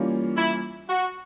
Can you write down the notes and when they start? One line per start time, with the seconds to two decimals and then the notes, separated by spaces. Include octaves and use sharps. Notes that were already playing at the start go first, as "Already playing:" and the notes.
Already playing: E3 G3 A#3 C#4 F4
0.37 E4
0.89 F#4